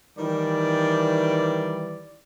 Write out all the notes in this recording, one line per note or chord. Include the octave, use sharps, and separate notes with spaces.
D#3 E3 G3 D5